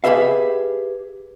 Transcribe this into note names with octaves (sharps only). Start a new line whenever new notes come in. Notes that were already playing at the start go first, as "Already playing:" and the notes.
G4 G#4 B4 E5 F5